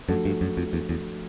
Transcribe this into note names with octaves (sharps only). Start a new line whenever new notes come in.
F#2 F3 A3 D4 F#4 A4
G2
F#2
F2
E2
E2